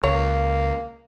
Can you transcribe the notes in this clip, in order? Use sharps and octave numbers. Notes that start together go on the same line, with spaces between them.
C#2 A#3 C#5